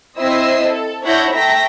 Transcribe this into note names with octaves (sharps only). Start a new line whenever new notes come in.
C4 E4 C5 D#5 E6 C7
A4
D4 E4 C#5 F#5 G6 A#6
A3 E5 G5 A#5 A#6 B6